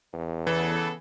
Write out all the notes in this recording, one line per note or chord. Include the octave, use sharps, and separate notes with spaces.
E2
C#3 E3 B3 A4